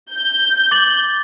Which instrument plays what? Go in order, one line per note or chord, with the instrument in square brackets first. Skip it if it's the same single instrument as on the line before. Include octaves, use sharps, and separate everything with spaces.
[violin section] G6
[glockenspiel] D6 A6 F#7